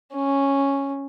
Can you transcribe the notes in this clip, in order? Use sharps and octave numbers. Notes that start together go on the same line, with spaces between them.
C#4